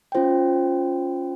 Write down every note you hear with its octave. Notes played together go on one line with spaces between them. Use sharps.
C#4 F4 C5 G5